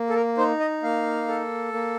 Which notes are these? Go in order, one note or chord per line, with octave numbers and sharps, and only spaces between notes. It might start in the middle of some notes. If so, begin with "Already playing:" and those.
Already playing: A#3
A4
A#4
D#4 C5
D#5
A#3 F5
A4
A#3